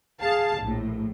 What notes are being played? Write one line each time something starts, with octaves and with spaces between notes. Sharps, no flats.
G#4 F5 A5
A#1 A2